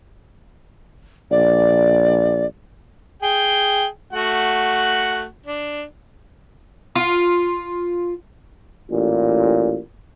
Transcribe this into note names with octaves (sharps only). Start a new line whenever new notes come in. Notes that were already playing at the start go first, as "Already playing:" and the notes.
A#1 D5
G#4 G5
A3 F#4 F#5
D4
F4
A1 A#2